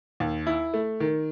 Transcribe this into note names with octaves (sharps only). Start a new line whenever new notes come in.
D#2
E4
A3
D#3